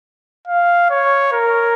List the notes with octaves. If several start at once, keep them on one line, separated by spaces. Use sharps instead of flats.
F5
C#5
A#4